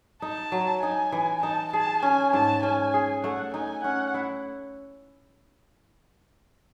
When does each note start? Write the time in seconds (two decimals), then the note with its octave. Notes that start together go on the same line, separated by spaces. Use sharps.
0.22 D#4 A5
0.52 F#3
0.83 D#4 G#5
1.12 E3
1.43 D#4 A5
1.73 G#4 A5
2.02 C#4 G#5
2.33 G#2 A5
2.63 C#4 G#5
2.94 G#4
3.24 A3 F#5
3.54 D#4 G#5
3.84 C#4 F#5
4.14 E4